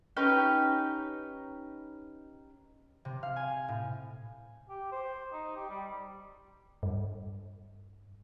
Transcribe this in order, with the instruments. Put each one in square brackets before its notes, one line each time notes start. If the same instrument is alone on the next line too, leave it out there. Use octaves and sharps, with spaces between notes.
[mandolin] C#4 D#4 G4 B4
[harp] C3
F5
G#5
A2
[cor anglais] G4
C5
D#4
G4
G3
[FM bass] G2